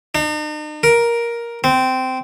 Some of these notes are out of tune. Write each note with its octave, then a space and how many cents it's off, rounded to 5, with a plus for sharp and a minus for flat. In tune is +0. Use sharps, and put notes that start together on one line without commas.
D#4 -45
A#4 +10
C4 -15